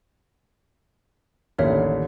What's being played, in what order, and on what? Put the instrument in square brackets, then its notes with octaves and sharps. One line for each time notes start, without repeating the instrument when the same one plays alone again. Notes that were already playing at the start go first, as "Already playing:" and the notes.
[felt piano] A1 D#2 D3 [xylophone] A#4 C#5 E5